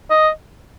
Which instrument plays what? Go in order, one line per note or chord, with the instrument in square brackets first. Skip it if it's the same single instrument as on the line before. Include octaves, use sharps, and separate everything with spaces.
[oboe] D#5